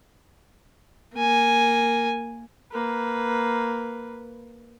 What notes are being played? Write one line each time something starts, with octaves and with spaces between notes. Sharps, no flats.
A#3 G#5
A#3 B4